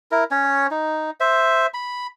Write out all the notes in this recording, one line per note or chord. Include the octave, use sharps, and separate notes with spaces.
E4 A#4
C#4 C#5
D#4
C5 E5
B5